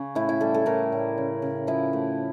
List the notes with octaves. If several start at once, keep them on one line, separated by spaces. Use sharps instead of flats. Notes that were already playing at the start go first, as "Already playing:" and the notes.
Already playing: C#3 C#5
A2 E4
E4
G3 A4
A4
A2 A#4
A2
C#3
C#3
F3 E4
A3